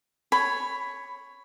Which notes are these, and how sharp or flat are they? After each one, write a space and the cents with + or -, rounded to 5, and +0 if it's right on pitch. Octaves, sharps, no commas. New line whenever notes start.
C#5 +0 B5 +10